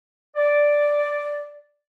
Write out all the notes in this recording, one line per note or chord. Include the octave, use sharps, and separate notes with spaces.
D5